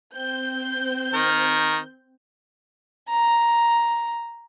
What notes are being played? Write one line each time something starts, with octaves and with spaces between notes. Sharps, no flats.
C4 G6
D#3 A#4
A#5